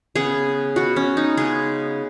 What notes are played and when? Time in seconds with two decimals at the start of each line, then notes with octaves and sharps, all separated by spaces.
0.15 C#3 B3 G#4
0.76 B2 B3 F#4
0.96 C#4
1.17 D#4
1.37 C#3 G#3 B3 G#4